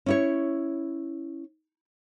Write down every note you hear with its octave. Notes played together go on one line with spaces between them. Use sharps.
C#4 E4 C#5